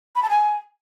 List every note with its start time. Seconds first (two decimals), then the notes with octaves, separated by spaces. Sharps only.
0.15 B5
0.23 A5
0.30 G#5